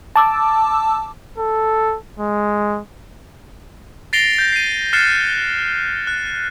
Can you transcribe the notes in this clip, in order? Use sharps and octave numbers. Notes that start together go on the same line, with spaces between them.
A5 D6 E6
A4
G#3
A6 A#6 C7 D7 F7 G7
G6 A#6
C7 D#7
F6 F#6 A6 C7 C#7 E7
F#6